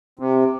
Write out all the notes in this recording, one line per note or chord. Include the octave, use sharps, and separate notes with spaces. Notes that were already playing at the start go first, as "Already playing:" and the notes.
C3